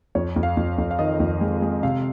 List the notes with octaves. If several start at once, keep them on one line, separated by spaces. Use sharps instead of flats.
F2 C#5
F2
F5
F2
F2
F5
D#3 D#5
F2
G#3
G#3
C3 F5